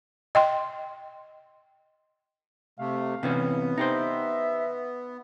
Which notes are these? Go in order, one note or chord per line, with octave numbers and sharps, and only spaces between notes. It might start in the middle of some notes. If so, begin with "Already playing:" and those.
D#5 G5 C6
C3 A3 F5
C3 E3 B3 C#4
D#4 G4 C5 E5